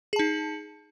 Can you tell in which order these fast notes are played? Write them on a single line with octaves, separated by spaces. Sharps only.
G#4 A5 D#4